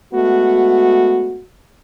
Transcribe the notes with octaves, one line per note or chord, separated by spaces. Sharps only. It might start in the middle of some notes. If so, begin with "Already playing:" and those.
G#3 A3 B3 F#4